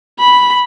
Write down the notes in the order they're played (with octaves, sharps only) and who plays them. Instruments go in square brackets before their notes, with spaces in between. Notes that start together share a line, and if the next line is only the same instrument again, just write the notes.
[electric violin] B5